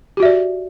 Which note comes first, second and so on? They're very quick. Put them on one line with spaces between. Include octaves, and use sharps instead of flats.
G4 F#4 E5 D5